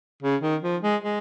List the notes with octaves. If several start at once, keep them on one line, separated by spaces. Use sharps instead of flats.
C#3
D#3
F3
G#3
G#3